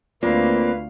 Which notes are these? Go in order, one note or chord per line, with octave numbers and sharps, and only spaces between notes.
D2 A#3 C4 F4 B4 D5 F5